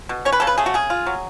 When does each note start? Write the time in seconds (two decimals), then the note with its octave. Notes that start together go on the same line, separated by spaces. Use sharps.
0.09 B2
0.25 C#4 C#5
0.32 B4
0.40 C#3 A4
0.47 B4
0.58 A3 G#4
0.66 F#4
0.74 C#3 G#4
0.90 F4
1.06 F#3